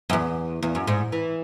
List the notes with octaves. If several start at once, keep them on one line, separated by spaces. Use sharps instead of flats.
F#2
E2
E2
F#2
G#2
E3